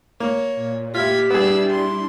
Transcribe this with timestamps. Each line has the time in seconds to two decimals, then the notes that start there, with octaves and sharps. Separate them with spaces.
0.20 A#3 C#5
0.55 A#2
0.95 E4 F4 G4 G#6 B6
1.30 G3 B3 D4 E4 G#4 E6
1.71 C6